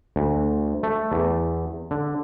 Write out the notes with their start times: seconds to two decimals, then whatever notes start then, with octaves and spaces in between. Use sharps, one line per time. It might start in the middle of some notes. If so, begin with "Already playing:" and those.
0.16 D2
0.83 A3
1.12 E2
1.91 D3